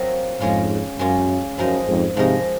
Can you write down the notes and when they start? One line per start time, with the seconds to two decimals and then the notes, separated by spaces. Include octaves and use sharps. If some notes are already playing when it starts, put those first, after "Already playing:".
Already playing: F#3 C4 F4 A#4 D#5
0.40 F2 G#2 G#3 C#4 F4
0.99 F#2 G#3 C#4 F4
1.58 F#2 F3 G#3 D#4 A#4 D#5
1.87 F2 G#2
2.16 G#2 C3 F3 G#3 D#4 A#4 D#5